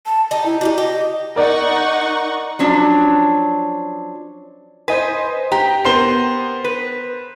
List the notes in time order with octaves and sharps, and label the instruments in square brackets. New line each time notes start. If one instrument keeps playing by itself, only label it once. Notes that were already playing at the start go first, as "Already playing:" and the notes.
[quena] A5
[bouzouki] D#4 G4 [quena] A5
[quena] E4
[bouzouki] D4 D#4 G4 [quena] F#4
[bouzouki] G4 [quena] D#5
[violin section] D#4 F#5 C#6 [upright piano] A#4 D5
[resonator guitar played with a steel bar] F3 F#3 C#4 D4
[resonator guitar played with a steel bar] B4 [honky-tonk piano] C5 D#5 G#5
[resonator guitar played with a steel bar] G4 [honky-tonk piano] G5 A#5
[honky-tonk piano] B3 C7 [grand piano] A#4 C5 G7
[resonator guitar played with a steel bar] B4